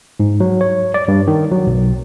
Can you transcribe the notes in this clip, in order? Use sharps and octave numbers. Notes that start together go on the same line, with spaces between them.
G#2
F#3
C#5
D5
G2
D#3
F#3
B1